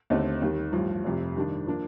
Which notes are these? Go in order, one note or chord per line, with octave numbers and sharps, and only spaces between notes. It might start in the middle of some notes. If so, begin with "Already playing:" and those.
D#2 D3 A3 C4 D#4
D#2 D#3 G3
A1 G2 F3
F1 F2 C3
G2 D#3 G3 D4
F3 A#3 D4